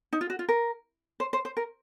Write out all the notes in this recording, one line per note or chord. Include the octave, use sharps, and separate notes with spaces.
D#4
F4
F#4
F4
A#4
C5
C5
C5
A#4